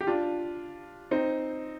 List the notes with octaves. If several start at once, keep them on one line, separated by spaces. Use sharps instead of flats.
G4
D4 F4
C4 D#4